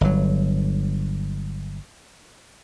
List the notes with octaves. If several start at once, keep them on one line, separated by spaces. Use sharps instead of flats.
G1 F#3